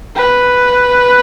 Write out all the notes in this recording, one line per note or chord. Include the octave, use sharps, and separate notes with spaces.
B4